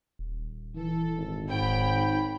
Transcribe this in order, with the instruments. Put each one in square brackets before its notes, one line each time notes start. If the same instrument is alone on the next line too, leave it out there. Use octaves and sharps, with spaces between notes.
[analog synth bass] D#1
[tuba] E3 [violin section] A4
[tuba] G#1
[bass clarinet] G#2 [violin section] C#5 G5 B5